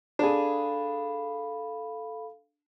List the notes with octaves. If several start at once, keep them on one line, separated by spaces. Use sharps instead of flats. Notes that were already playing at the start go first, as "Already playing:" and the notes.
D4 G#4 A4 F5 B5